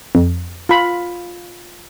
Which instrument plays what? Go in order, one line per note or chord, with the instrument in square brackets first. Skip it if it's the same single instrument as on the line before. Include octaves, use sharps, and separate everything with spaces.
[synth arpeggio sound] F2
[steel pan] F4 B5